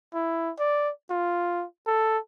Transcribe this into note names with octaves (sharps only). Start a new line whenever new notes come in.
E4
D5
F4
A4